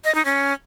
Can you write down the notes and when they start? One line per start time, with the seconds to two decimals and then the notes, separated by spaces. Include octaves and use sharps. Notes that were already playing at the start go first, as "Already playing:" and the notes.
0.04 D#5
0.15 D#4
0.25 C#4